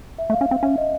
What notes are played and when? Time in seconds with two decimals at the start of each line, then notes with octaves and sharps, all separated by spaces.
0.18 E5
0.30 A3
0.33 F5
0.41 C#4
0.47 C4 F5
0.63 C#4 E5
0.78 D#5